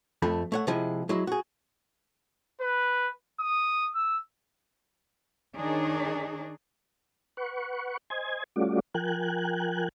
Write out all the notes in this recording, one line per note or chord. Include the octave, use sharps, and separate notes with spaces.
F2 A3 B5
A3 C#5 F#5
C3 F3 G#3 E4
F#3 G#3 E4
F#4 G#4
B4
D#6
E6
D#3 D4 D#4 G#4 C#5
B4 F#5 C#6
C5 D#5 G#5 G#6
G3 A3 C#4 F4 F#4 D5
F3 A#4 G5 G#5 F#6